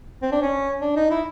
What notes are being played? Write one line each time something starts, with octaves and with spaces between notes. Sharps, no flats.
C4
D4
C#4
D4
D#4
E4